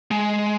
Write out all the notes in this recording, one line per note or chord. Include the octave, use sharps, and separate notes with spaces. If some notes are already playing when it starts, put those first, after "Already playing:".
G#3